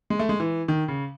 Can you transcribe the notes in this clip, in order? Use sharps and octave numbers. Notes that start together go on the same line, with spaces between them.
G#3
A3
G#3
E3
D#3
C#3